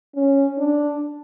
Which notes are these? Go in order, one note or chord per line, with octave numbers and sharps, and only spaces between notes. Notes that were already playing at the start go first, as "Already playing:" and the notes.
C#4
D4